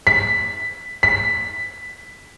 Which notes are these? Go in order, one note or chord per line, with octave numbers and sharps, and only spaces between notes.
B6
B6